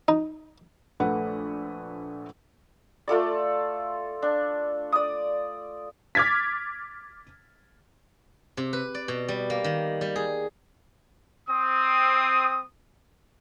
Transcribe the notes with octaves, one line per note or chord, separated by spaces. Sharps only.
D#4
A#1 A3 B4 F#5
A3 F4 A4 D5
D4
D5 D#6
D6 F6 G#6 A6 B6
C3
B4
D5
B2
G3
A#3
D#3
G3
G#4
C4 D#6